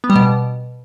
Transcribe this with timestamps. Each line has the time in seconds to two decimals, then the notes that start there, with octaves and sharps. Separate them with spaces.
0.04 B3
0.10 G3
0.16 B2